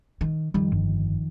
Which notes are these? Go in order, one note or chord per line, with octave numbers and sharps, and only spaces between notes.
D#3
F2 D#3 G3
G1